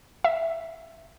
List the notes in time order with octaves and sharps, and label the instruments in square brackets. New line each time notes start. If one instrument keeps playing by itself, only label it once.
[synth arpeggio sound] E5